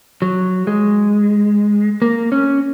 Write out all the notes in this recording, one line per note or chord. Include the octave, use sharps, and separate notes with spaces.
F#3
G#3
A#3
C#4